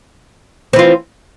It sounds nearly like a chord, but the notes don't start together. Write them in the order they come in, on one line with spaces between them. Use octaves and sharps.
C4 E3 F4